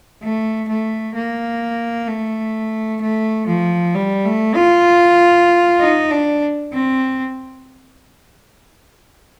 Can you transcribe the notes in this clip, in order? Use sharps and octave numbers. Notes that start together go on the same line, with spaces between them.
A3
A3
A#3
A3
A3
F3
G3
A3
F4
D#4
D4
C4